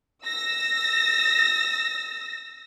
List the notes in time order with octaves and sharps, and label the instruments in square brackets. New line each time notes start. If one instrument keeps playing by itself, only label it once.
[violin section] E6 A#6